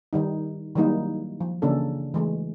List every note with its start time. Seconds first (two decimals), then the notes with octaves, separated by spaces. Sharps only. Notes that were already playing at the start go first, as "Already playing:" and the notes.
0.13 D#3 G3 D#4
0.76 D#3 F#3 G3 A#3 D#4 E4
1.41 F3
1.62 C#3 E3 A#3 C#4 D4 A4
2.14 E3 G#3 A3